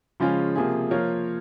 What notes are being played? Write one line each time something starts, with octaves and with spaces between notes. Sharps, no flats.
C#3 F3 G#3 C#4 F4
C3 F3 A#3 F4 G#4
F3 A#3 F4 A#4 C#5